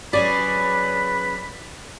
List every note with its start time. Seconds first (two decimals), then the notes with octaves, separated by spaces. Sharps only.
0.13 F#3 C#4 G#4 B4 D5 B5